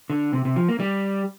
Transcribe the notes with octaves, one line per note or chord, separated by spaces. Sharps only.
D3
C3
C3
F3
A#3
G3